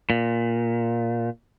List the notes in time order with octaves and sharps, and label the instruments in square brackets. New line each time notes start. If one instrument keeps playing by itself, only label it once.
[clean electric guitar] A#2